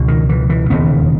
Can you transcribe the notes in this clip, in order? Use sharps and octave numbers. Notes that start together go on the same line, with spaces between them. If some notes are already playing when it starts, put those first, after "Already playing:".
Already playing: C#2 B2
D#3
E3
E3
E1 D#2 C#3 B3